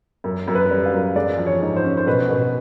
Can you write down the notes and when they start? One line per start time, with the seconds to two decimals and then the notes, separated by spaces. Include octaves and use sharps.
0.24 F#2
0.47 F#2
0.55 B4
0.70 G3
0.86 F5
0.93 F#2
1.16 G#3 D5
1.38 F3
1.46 C#5
1.61 G#2
1.76 C5
1.84 C#4
1.97 C5
2.07 B2 B4
2.30 B2